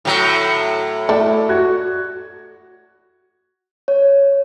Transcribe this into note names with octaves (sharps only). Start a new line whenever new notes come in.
A2 F#3
A3 E4 D5
F#4 G#6
C#5